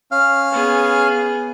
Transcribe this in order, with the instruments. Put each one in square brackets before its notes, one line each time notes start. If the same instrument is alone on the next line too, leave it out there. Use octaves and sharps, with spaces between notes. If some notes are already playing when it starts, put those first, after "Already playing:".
[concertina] C#4 F5 F6
[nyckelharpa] B3 G#4